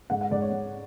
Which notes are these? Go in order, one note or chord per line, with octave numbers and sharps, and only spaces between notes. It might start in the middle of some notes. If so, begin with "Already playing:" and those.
G#2 F#5
F#5
G#2 D5
C#5
G#2